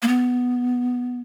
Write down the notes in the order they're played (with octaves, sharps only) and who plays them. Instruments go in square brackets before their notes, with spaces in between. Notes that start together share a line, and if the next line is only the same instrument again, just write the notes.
[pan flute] A#3
B3